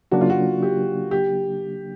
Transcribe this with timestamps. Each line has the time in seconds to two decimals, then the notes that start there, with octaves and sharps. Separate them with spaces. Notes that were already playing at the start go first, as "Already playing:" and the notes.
0.11 C#3 F#3 A#3 D4 F#4
0.21 F4
0.30 F#4
0.63 G4
1.11 G4